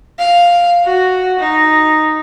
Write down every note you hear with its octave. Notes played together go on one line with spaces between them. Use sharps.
F5
F#4
D#4